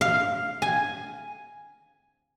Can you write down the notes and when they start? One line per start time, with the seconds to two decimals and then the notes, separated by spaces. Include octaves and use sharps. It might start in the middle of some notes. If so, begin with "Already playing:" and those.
0.01 F5
0.62 G#5